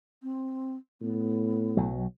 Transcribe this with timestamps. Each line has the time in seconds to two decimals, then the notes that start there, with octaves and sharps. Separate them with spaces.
0.23 C4
1.01 A2 B3
1.77 B1 F#3